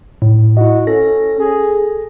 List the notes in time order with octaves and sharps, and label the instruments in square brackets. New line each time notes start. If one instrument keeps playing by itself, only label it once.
[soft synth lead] A2
[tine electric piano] E4 D#5 [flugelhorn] F#4
[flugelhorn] C#4 [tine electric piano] A4 [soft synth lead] A#6
[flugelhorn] G#4